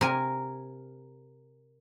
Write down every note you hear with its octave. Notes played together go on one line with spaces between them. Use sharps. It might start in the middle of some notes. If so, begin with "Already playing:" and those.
C3 A#4 G#5